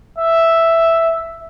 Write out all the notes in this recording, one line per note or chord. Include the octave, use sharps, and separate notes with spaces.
E5